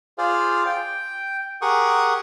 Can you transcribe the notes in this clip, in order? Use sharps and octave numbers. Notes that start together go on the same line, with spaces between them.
F4 G#4 C5 D5 F5
G5
G4 G#4 A#4 F#5 C#6 D#6